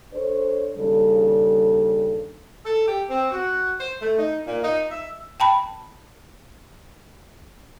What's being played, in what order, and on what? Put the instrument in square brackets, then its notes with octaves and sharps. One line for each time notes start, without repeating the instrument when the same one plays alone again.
[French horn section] D4 A4 C5 C#5
D#2 C#3 G3 D4 A4
[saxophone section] A4
G4
C4
F#4
C5
A3
D#4
A#2
D#4
E5
[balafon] G5 A5 B5